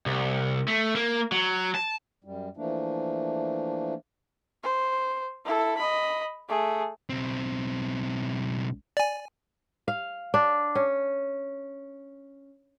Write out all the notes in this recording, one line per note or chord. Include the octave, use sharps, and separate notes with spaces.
C2
A3
A#3
F#3
A5
F#2 G3
E3 F3 A3 A#3 D4
C5
E4 A4
D#5 B5
A3 G#4
B1 C4
D5 G#5
F5
D4
C#4